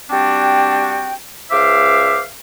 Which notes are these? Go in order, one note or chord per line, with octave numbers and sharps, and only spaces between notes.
G3 C4 D4 F#4 G5
C#2 C5 E5 F5 D6